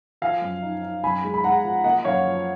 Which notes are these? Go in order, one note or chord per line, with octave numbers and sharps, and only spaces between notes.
F3 F5 G#5
F#2
D#4
D#4
F#2 G#5 B5
G#3
B5
G#3 F#5 A#5
F3
A#3 D#5 F#5
F#2 C#5 F5
F3